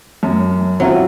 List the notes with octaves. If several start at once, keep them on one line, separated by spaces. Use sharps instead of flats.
F#2
F#3 C4 E4 F4